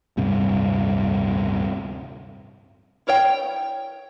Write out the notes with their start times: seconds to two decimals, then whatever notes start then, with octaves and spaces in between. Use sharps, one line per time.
0.17 D1 G2 C3
3.07 E4 A#4 C#5 G5